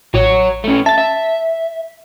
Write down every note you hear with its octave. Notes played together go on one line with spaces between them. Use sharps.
A1 F#3 F#4 C#5
A3 C#4
E5 A5 A6
E5